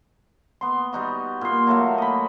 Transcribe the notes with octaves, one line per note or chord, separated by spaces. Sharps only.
B3 C6
G3 D#4 F#4
A#2 C6
F#3 A3 A#3
D#5 B5